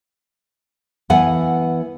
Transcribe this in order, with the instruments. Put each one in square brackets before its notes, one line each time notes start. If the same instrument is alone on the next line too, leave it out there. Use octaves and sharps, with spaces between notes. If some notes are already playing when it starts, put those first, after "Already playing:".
[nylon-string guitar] E3 B3 F#5 G#5